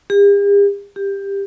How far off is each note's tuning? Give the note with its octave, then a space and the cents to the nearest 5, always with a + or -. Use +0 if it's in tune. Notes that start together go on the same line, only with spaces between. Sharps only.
G4 +45
G4 +15